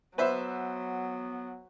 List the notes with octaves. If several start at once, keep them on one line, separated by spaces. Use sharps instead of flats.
F#3 B3 B4 C5 E5